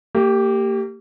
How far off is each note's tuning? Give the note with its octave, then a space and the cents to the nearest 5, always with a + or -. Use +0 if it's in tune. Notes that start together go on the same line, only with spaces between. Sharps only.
A#3 -35 G4 +0